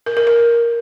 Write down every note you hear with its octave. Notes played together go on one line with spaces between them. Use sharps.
A#4
A#4
A#4